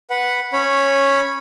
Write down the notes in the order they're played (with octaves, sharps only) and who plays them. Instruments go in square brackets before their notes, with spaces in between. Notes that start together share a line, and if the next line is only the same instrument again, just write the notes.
[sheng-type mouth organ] B4 F#5
C#4 C#5 B5